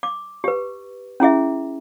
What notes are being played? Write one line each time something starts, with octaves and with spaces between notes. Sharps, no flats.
D6
G4 B4
C#4 E4 G#4 E5